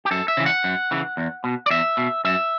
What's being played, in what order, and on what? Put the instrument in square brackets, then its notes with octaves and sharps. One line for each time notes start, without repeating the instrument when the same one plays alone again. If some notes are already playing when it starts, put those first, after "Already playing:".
[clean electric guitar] G4
F#2 A4
E5
C#3 E3
F#5
F#2
C#3 E3
E2
B2
D5
E2 E5
B2
F#2 E5